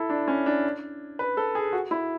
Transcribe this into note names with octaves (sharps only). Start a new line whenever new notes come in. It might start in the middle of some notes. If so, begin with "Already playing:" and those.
Already playing: E4 A4
D4
C#4
D4
B4
A4
G#4
F#4
E4